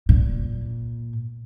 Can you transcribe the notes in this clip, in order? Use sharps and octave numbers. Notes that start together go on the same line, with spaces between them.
A#2